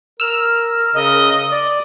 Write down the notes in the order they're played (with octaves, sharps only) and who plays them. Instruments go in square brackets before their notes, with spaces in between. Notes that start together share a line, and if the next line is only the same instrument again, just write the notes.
[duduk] A#4 [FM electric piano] E6 F6
[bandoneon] C#3 [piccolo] D#5
[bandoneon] D5